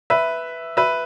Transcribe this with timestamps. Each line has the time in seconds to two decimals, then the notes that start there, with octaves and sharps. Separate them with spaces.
0.10 B4 E5
0.77 B4 E5